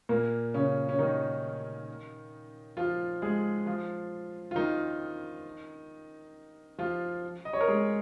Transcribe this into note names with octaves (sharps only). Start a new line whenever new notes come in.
A#2 A#3
C#3 C#4
C#4
D#3 D#4
F3 F4
G#3 G#4
F3 F4
F4
D#3 D#4
F3 F4
D#5
C#5
A#4
G#3 G#4